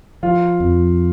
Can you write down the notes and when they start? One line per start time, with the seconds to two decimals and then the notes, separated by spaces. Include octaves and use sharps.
0.23 F3 F4
0.60 F2